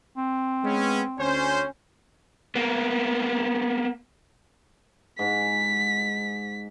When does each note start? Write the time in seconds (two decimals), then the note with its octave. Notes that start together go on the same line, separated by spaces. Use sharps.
0.17 C4
0.63 G#3 B3 C#4
1.19 D2 C#4 C5
2.55 A#3 B3
5.19 G#2 B6